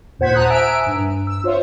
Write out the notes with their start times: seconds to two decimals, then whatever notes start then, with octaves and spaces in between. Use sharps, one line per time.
0.19 D#2 A#2 C5 F#5 G#6 B6
0.34 A5 A#5 D#6 F#6
0.50 E5 G#5 A#5 E6 D7
0.86 G2
1.27 E6
1.44 F4 C5 C#5 E5